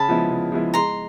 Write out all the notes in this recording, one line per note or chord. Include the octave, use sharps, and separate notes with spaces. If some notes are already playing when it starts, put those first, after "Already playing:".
Already playing: C#3 A5 B5
F3 G#3 B3 E4
C#3
F3 G#3 B3 E4
G#3 A#5 C6